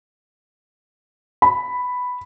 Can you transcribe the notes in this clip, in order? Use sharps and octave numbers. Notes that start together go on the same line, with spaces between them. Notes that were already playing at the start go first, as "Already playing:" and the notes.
B5